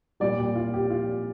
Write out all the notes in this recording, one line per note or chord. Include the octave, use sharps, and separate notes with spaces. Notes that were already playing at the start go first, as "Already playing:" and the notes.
A#2 G3 D5
G4
F4
G4
F4